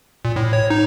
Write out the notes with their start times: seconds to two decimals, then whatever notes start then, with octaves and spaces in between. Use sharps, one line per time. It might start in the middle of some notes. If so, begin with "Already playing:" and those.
0.25 A#2
0.36 A2
0.53 C#5
0.70 D#4